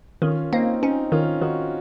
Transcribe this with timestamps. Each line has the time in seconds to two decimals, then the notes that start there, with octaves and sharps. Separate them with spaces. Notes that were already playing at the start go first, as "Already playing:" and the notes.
0.22 D#3 C#4 F4
0.52 A#3 C4 D#4
0.82 C4 C#4 D#4
1.12 D#3 C#4 F4
1.42 D#3 D#4 F#4